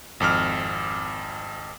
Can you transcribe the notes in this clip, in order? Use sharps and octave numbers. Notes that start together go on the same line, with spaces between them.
G#1 F2 D6 F6